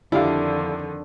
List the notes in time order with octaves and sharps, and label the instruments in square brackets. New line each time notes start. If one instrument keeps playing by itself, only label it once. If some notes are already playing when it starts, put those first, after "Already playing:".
[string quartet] F2 D3 D#3 [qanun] D4 [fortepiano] E4 G4 F5